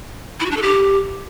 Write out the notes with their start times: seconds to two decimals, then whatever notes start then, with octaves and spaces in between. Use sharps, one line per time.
0.40 E4
0.46 F#4
0.51 D4
0.57 A4
0.62 G4